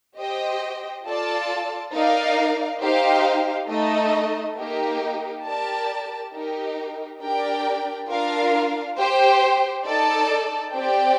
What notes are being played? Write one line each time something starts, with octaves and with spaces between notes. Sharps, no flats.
G4 C5 D#5 G5
F4 A4 D5 A5
D#4 A#4 D5 F5
D#4 G4 C5 F5
A3 D#4 A4 D#5
A#3 D#4 G4 A#4
G4 A#4 D5 A5
D#4 G4 A#4
D4 G4 A#4 D5 G5
D4 F4 A#4 F5
G4 C5 G5
D#4 A4 D5 A5
C4 G4 D5 G5